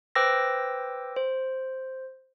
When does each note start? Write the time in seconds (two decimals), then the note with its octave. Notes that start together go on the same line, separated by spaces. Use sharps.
0.15 B4 C5 G5 D6 E6 A#6
1.16 C5